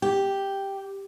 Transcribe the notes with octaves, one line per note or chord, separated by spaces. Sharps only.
G4